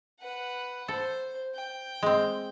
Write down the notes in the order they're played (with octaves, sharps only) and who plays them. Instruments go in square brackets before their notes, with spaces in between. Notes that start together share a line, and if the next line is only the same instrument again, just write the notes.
[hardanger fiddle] B4 F#5
[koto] A4 [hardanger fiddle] C5
[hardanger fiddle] G5
[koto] G#3 C4